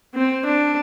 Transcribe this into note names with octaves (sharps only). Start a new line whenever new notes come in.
C4
D4